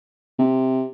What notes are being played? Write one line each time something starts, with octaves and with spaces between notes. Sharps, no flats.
C3